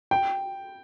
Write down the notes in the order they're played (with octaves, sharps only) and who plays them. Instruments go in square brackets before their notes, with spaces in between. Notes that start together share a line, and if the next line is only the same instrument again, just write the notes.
[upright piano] G5